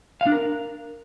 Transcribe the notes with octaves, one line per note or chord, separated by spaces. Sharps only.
F5
D4
A#4